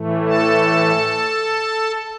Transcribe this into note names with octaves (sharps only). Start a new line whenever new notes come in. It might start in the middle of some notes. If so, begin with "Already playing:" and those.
Already playing: A2 E3 A3
A4 A5